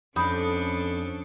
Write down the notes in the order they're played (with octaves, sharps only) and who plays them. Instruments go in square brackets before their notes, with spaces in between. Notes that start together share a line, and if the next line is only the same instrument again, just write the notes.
[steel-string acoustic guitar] F2 [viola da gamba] C#4 D4 A4 [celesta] B5 D#6 G6